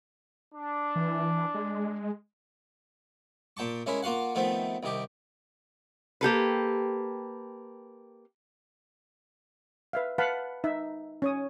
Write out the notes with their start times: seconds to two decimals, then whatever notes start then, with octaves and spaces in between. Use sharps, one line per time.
0.52 D4
0.96 E3
1.54 G#3
3.57 A#2 G5 A5 C#6
3.86 G#3 C#4 E4 A#4
4.03 A#3 F4 F#4 F5 F#5
4.35 D#3 F3 A3 B3 C4
4.83 C2 D#3 G4
6.21 A#3 G4 A4 B4
9.93 B4 E5 F5
10.18 B4 F5 F#5 A5 B5
10.64 D#4 E5
11.22 C#4 C#5 D#6